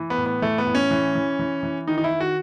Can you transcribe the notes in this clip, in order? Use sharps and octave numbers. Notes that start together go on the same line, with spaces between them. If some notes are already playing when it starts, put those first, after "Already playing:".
Already playing: E3
B3
A2
B3
E3 A3
B3
A2
C#4
E3
E3
E3
E3
D#3 D#4
D#4
E4
D#3
F#4